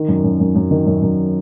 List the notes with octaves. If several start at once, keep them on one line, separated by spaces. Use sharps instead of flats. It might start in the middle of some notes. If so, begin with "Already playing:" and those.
Already playing: D#3
F#2
F#2
F#2
F#2
D#3
F#2
F#2